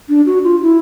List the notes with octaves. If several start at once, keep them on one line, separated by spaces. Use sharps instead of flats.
D4
F#4
F4
E4